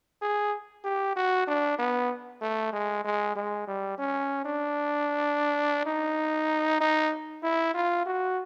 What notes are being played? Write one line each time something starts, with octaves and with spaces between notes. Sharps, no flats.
G#4
G4
F#4
D4
B3
A3
G#3
G#3
G#3
G3
C#4
D4
D#4
D#4
E4
F4
F#4